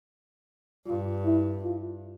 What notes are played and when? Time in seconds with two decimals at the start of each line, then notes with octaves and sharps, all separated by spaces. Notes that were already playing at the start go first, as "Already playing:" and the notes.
0.87 G2 F4
1.25 E4
1.63 F4